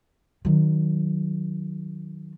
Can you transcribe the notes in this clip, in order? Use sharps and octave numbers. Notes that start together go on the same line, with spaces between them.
D#3 F#3